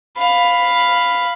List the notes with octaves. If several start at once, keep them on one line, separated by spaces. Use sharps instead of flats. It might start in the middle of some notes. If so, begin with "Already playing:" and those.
F5 B5